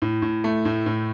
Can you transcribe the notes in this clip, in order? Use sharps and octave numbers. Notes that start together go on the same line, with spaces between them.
A2
A2
A3
A2
A2